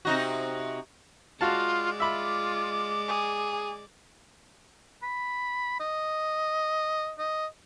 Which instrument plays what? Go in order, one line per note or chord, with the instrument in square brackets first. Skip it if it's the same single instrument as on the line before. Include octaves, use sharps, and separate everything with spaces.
[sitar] C3 D#4 F#4
[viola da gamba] G#3 D5 [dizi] F4 [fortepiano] F#4 F5 A5
[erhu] F4 [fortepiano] E5 B5 [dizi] D6
[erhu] G#4
[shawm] B5
D#5
D#5